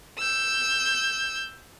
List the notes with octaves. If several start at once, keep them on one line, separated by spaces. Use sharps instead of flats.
E6 G6